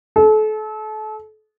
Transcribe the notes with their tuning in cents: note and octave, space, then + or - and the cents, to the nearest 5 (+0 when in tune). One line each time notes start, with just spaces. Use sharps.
A4 -35